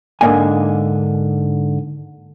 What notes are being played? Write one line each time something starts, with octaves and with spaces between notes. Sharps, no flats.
G#2 D3 A#3 D#5 G#5